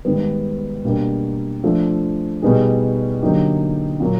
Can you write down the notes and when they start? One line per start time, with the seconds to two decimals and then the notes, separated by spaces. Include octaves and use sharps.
0.05 G#2 D#3 G3 B3
0.85 B2 G3 A#3 D4
1.64 F3 A3 D4 F4
2.42 B2 G3 B3 D#4 G#4
3.22 D3 F#3 A#3 D#4 G4
4.00 A#2 F#3 A#3